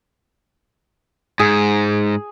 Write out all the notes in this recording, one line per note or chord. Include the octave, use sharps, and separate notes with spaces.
G#2 G#4